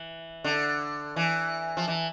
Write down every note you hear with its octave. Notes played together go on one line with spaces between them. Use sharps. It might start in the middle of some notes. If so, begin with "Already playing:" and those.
Already playing: E3
D3
E3
F3
E3